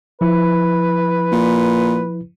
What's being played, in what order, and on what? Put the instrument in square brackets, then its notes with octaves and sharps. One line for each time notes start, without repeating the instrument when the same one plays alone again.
[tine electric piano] F3 E4 [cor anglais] B4
[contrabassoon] A#2